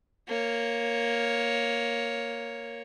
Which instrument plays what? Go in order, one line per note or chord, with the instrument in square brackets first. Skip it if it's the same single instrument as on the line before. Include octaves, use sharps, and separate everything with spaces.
[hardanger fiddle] A#3 C#5